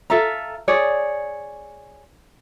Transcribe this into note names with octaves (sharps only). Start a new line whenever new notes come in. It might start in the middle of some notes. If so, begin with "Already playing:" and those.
F4 A4 E5 A#5
G#4 C#5 D5